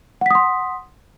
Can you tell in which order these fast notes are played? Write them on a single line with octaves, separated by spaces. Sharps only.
F#5 B6 D#6 C6